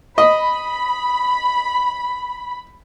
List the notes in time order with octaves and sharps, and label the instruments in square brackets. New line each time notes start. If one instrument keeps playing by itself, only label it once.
[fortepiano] D#5 [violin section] B5